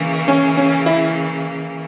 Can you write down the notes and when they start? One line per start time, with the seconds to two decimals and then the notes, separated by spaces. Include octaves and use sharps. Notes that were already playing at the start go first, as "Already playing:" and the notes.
Already playing: C#3 E3 A#3
0.28 C#4
0.57 C#4
0.86 E4